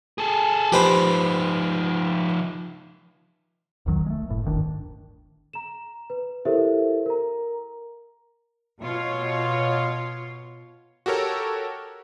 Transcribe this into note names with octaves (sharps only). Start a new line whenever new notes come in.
G#4 A4
F3 D#4 G4 B4 C5
E1 B1 D#3 F#3
G#3 A3
F#1 A2
D1 G1 D#3 D4
A#5 E7
B4
E4 G4 A4 A#4 C5 E5
A#4 A#5
B2 F4 C#5
F#4 G4 A4 A#4 C#5